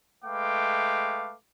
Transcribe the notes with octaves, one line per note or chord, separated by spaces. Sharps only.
G#3 A3 B4 F5 G5 D6